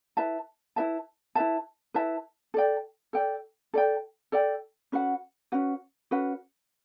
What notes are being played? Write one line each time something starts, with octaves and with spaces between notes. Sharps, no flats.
E4 B4 E5 A5
E4 B4 E5 A5
E4 B4 E5 A5
E4 B4 E5 A5
A4 D5 G5
A4 D5 G5
A4 D5 G5
A4 D5 G5
C#4 F#4 B4 F#5
C#4 F#4 B4 F#5
C#4 F#4 B4 F#5